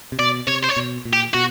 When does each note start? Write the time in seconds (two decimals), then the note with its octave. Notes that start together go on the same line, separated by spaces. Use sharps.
0.12 C3
0.19 B2 D5
0.47 C3 C#5
0.63 C5
0.69 C#5
0.77 B2
1.05 A#2
1.13 G4
1.34 B2 F#4